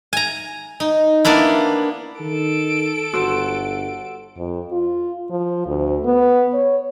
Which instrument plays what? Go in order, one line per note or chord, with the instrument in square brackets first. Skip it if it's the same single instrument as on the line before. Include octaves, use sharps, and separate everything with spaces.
[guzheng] G#5 A#5
D#4
A#3 B3 D4 E4
[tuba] D#3 [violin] A4 D7
[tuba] G1 [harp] F#4 C5 E6
[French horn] F2
F4
F3
D2
B3
C#5